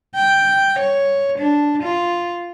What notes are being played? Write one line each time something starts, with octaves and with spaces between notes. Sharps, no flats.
G5
C#5
D4
F4